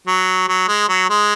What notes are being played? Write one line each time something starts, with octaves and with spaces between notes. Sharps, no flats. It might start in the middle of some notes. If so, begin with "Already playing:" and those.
F#3
F#3
G#3
F#3
G#3